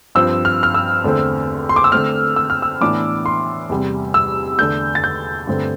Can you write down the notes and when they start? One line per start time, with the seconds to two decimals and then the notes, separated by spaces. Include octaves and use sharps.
0.15 G2 F3 C4 E6
0.45 F6
0.63 F6
0.74 E6
1.04 E2 D3 A3 C4
1.69 C6
1.76 D6
1.84 E6
1.92 D3 A3 C4 F6
2.36 E6
2.50 F6
2.62 E6
2.81 A2 E3 B3 D4 D6
3.26 C6
3.69 E2 C3 G3
4.14 E6
4.59 E2 D3 A3 D4 G6
4.95 A6
5.04 G6
5.47 G2 D3 A3 C4